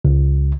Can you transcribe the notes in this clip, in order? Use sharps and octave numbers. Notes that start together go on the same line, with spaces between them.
C#2